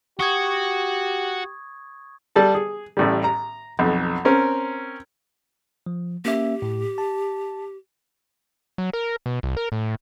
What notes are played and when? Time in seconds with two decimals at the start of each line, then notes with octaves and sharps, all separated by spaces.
0.19 F#4 G4 C#6 D#6 G#6
2.36 G3 A4 A5
2.54 G#4
2.97 A1 A2 G3
3.24 A#5
3.79 B1 F2
4.25 C4 C#4 A#4
5.86 F3
6.25 A#3 C#4 G4 E5
6.62 A2
6.98 A5
8.78 F#3
8.93 A#4
9.26 B2
9.43 C2
9.57 A#4
9.72 A2